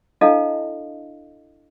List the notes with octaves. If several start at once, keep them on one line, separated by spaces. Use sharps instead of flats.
D4 E4 A4 D#5 F5 A5